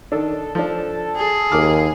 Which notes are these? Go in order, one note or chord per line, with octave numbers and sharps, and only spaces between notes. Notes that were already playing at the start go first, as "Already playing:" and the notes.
D#3 D4 A4
F3 D4 A4
G#4
D#2 A#3 D6 F6